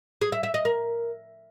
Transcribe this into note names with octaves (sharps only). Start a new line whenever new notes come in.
G#4
E5
E5
D#5
A#4